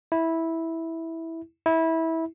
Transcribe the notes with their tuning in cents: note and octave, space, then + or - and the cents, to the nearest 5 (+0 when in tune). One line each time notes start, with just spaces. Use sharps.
E4 -10
E4 -20